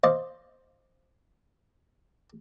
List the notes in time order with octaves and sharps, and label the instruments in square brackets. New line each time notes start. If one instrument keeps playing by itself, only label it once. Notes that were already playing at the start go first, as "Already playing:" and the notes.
[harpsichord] C5 D5 D#5 F5